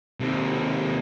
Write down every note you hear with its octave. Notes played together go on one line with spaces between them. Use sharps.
D#2 C3